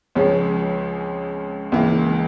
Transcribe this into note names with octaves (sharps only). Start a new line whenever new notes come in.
C#2 C#3 F3 C#4
C#2 C#3 E3 A#3